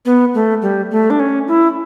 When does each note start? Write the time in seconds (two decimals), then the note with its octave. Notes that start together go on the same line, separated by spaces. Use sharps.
0.05 B3
0.34 A3
0.62 G3
0.91 A3
1.10 D4
1.19 C#4
1.48 E4